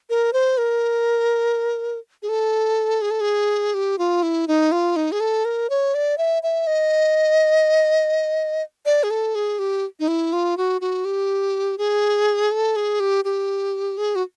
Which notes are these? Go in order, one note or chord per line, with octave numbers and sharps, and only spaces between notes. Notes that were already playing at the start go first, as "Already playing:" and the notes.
A#4
C5
A#4
G#4
A4
G#4
A4
G#4
G4
F4
E4
D#4
F4
D#4
G#4
A4
A#4
C#5
D5
E5
E5
D#5
D5
G#4
A4
G#4
G4
D#4
E4
F4
F#4
F#4
G4
G#4
A4
G#4
G4
G4
G#4
F#4